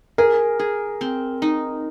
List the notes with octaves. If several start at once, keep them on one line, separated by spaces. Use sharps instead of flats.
G#4 A#4
G#4
C4
D#4